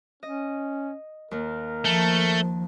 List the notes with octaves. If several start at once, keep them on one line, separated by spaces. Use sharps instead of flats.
C#4 D#5
D#2 A#3 A#4
F3 A3 A5